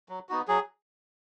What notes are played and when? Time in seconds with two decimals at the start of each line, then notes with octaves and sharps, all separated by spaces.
0.09 F#3
0.29 B3 D#4 F#4
0.48 F#3 G#4